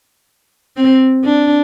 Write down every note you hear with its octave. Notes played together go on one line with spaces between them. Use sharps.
C4
D4